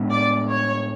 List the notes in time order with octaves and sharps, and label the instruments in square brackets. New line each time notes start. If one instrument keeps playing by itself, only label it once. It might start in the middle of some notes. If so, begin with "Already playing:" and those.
Already playing: [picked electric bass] A2 G#3 B3 D4
[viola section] D5
C#5